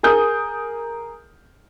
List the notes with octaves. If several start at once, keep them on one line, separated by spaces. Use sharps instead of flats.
G#4 A#4 D#6 G6